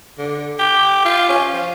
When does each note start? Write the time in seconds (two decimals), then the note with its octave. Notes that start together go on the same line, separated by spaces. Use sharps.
0.18 D3
0.59 G4
1.05 F4
1.29 C#4
1.53 F3